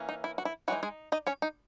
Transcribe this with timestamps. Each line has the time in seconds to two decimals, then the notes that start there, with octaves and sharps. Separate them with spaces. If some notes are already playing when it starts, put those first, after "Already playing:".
Already playing: E3 A#3 C#4
0.09 D#4
0.24 E4
0.38 F#4
0.45 E4
0.68 E3 F#3 G#3 D#4 F#4
0.83 G#3 G#4
1.12 D#4 D#5
1.27 C#4 C#5
1.42 D#4